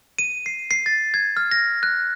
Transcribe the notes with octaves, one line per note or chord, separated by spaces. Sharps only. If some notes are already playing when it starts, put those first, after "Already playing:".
D#7
C7
C7
A6
G#6
F6
A#6
F#6